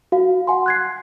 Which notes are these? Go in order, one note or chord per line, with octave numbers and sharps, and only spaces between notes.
F#4 F5
F#5 G#5 C6
F#6 G#6 C7